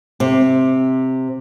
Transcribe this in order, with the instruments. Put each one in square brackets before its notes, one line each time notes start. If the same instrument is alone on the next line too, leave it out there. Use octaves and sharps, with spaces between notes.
[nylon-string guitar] C3